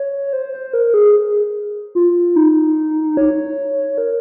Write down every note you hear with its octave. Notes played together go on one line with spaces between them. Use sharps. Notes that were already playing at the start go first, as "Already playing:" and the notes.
Already playing: C#5
C5
C5
A#4
G#4
F4
D#4
C#5
A#4